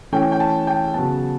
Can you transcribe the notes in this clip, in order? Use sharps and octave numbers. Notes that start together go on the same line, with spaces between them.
E3 A3 C#4 G5
G5
A5
G5
C#3 F#3 B3 A5